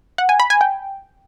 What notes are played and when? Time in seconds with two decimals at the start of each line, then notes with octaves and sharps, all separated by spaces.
0.18 F#5
0.29 G#5
0.40 B5
0.50 G#5
0.61 G5